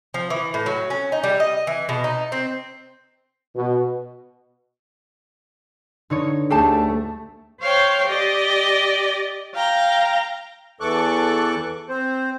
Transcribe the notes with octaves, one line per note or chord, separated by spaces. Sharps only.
F3
E3
A2
F#3
C#4
D#4
G3
D#5
E3
B2
D#4
C4
B2
D3 D#4 C#5
D2 A3 G4 G#4 A5
C5 C#5 F5 G5
G4 D5 D#5
F5 G5 A#5
E2 E3 A4 C#6 D6 F#6
C4 C5